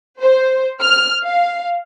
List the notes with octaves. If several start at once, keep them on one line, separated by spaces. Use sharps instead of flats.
C5
F6
F5